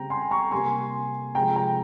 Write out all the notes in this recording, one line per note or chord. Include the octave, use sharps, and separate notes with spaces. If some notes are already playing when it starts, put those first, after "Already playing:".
Already playing: C#3 G3 C4 G5 A#5
G#5 C6
A#5 C#6
C3 G3 A#3 G#5 C6
C3 F3 G#3 C4 G5 A#5
G5 A#5